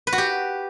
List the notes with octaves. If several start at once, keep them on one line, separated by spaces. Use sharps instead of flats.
B4
F#4
G4